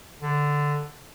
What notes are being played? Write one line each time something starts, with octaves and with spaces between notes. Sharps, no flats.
D3